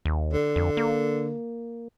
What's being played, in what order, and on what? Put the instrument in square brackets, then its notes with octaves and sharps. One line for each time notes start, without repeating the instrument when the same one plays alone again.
[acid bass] D#2
[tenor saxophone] D3
[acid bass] F2
A#3